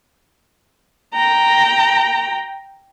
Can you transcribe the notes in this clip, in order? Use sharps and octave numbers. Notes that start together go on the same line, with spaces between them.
G5 A#5